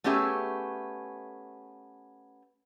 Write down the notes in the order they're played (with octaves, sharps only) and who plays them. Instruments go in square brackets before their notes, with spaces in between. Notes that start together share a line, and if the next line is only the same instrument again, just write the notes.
[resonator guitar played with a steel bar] A3 B3 C#4 G4 G#4 E5